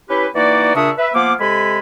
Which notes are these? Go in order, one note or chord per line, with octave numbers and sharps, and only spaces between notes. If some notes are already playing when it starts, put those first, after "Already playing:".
C#4 E4 G4 B4
E3 A#3 D#4 F#4 D5
A#2 C#3 D4 E5 C#6 D#6
B4 E5
F3 A#3 B3 F5 D6
C3 G#3 A4 G#5 B5